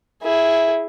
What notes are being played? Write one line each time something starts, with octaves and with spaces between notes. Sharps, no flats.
E4 G#4